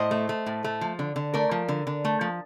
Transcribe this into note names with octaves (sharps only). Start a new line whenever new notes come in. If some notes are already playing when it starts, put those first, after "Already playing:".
Already playing: A2 C5 D#5
A3
A3
A2
A3
F3
D3
D3
A3 A#4 D5
F3
D3
D3
A3
F3